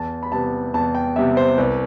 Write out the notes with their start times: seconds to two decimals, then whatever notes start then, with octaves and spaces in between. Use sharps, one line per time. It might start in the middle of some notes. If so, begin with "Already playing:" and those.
Already playing: E2 A5
0.23 B5
0.32 C3 G3 B3 A5
0.74 E2 A5
0.95 G5
1.16 C3 G3 B3 E5
1.37 C5
1.58 C2 B4